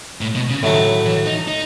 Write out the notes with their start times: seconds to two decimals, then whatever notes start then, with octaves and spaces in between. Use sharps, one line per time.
0.21 A2
0.35 B2
0.49 C#3
0.63 A2 D#3 F#3 A3
1.06 E3
1.27 D#4
1.48 D#4